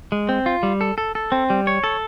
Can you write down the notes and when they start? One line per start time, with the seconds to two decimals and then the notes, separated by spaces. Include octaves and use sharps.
0.12 G#3
0.29 C4
0.46 F4
0.63 G3
0.81 A4
0.98 A4
1.15 A4
1.32 C4
1.50 G3
1.67 C#5
1.84 A4